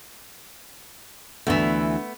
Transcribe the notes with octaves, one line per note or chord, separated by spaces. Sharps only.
D2 E3 A3 B3